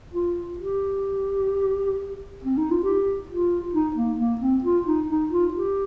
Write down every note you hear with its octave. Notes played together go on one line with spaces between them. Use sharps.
F4
G4
C4
D#4
F4
G4
F4
D#4
A#3
A#3
C4
F4
D#4
D#4
F4
G4